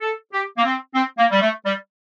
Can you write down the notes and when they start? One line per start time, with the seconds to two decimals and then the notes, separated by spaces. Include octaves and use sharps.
0.01 A4
0.32 G4
0.57 A#3
0.64 C4
0.94 C4
1.18 A#3
1.31 G3
1.41 A3
1.65 G3